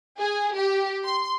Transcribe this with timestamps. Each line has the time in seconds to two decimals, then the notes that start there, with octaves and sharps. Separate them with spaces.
0.20 G#4
0.56 G4
1.05 C6